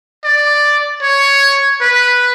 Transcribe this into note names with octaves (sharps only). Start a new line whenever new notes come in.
D5
C#5
B4